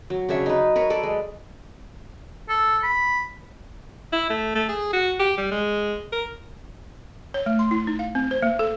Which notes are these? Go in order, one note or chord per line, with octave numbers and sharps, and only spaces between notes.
F#3
C#3 D4 C#5 E5
D#4 B4
A#4 B4 C#5
A4 B4 D5
G#3
A4
B5
E4
A3
A3
G#4
F#4
G4
G3
G#3
A#4
C#5
A3
C6
E4
D#4
F5
C4
C5
A#3
A4